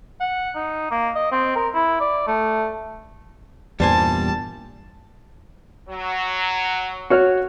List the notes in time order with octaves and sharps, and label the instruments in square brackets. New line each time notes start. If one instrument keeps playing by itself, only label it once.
[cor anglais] F#5
D#4
A#3
D#5
C4
A#4
E4
D5
A3
[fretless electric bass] E2 G2 A#2 [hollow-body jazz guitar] G3 C5 G#5 [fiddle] A5
[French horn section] F#3
[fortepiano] F#4 C#5 F6